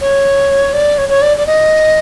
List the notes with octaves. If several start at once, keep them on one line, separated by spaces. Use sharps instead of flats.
C#5
D5
C#5
C#5
D5
D5
D#5